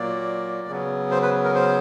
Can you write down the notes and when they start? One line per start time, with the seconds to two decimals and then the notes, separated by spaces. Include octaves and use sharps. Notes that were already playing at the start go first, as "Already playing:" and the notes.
Already playing: A#2 F#3 A#3 D5
0.68 C#3 F#3 B3
1.11 C5
1.22 B4
1.44 A#4
1.54 C5